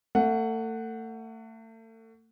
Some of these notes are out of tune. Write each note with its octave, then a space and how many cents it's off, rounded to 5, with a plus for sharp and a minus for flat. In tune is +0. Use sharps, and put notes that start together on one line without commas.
A3 +35 F#5 +0